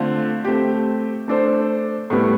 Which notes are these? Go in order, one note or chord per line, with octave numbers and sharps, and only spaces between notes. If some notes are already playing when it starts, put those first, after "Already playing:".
Already playing: D3 A3 C4 F4 C5
A3 C4 G4
A3 D4 A4 C5
A2 G3 B3